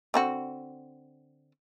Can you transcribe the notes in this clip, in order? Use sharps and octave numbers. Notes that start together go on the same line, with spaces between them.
D3 C4 F#4